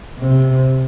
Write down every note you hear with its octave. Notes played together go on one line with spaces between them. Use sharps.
C3